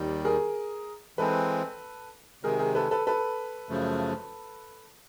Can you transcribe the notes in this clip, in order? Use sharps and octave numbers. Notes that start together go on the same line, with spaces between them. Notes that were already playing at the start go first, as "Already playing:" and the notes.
Already playing: D#2 D#3 G3
G#4 A#4
E3 G#3 C4 A4 B4
C3 D#3 G#3 G#4 A#4
G#4 A#4
A4 B4
A4 B4
A4 B4
F#2 C#3 F3 A3